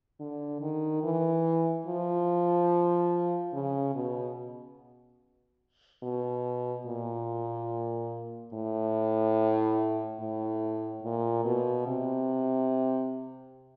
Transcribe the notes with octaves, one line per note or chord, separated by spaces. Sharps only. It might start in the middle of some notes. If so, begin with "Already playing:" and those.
D3
D#3
E3
F3
C#3
B2
B2
A#2
A2
A2
A#2
B2
C3